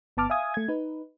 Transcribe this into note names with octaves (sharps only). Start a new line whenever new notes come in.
G1 B3 A5 D6 F6
E5 F5 G#5 D#6 G#6
A3 G#6
D#4 B4